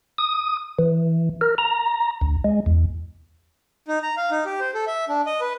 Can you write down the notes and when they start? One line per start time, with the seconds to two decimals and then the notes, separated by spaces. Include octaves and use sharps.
0.18 D#6
0.79 E3
1.41 A#4
1.58 A#5
2.21 D2
2.44 G#3
2.66 E2
3.88 D#4
4.03 A#5
4.17 F5
4.31 D#4
4.45 G4
4.60 C5
4.74 A4
4.87 E5
5.08 D4
5.26 D#5
5.41 B4